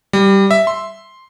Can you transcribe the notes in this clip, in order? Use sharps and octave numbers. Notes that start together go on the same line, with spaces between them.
G3
E5
C6